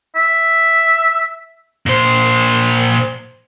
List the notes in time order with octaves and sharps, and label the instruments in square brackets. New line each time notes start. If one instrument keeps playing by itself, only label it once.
[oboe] E5
[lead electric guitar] A#2 C5